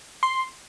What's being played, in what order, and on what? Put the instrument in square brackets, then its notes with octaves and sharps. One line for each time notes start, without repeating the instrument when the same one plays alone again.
[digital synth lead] C6